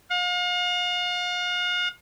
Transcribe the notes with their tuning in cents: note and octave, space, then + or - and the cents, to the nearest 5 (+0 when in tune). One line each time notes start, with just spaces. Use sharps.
F5 +40